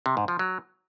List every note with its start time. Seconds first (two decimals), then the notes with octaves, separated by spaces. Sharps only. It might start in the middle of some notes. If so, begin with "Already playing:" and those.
0.06 C3
0.17 G#2
0.28 F3
0.39 F#3